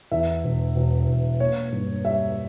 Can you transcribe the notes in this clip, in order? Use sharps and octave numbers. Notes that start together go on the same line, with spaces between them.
E2 E5
E1
E1
E1
A#3 C#5
G2
G3 E5